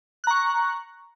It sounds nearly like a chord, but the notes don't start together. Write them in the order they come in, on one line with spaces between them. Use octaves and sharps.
F#6 A#5 C#6